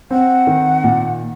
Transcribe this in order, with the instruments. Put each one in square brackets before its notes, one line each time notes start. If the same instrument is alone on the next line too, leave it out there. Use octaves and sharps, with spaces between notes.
[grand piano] C4 [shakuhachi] F#5
[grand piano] D#3
A#2